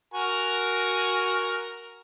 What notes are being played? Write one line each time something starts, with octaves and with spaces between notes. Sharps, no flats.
F#4 A#4 G#5